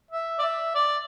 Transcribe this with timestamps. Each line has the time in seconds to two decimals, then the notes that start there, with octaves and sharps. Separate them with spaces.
0.11 E5
0.39 D5
0.42 E5
0.75 D5